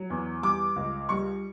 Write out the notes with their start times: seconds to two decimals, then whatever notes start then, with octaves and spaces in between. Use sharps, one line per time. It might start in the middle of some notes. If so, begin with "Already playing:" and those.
Already playing: F#3
0.10 E2
0.43 G3 D6
0.76 C#2
1.09 G3 C#6